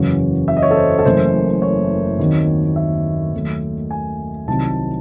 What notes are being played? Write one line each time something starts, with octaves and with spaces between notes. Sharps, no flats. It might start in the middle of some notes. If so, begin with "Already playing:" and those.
Already playing: F#1 E2 C#3 F#3 C#4 C#5
E5
D#5
C#5
A4
C5
C5
A4
F#1 F#2 E3 A3 C5
C#5
D#2 D#3 F#3 C4
E5
D#2 D#3 F#3 A3
G#5
C2 C3 D#3 F#3 C4 A5